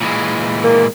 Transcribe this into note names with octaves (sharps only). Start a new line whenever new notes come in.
A#2 E3 G#3
A#3